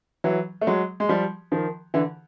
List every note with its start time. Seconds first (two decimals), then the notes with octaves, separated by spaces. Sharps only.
0.24 E3 F#3
0.61 A3
0.67 F#3 G#3
1.00 G#3
1.09 F3 G3
1.52 D#3 F3
1.94 D3 E3